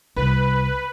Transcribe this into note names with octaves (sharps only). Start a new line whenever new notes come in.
C2 B4